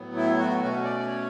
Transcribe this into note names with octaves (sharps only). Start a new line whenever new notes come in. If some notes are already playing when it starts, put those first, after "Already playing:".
Already playing: A2 F#3 B3
E4
F#4
B2 A3 C#4 F#4
D5
D5
C#5